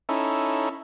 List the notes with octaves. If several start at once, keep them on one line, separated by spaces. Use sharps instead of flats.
C#4 D#4 E4 A4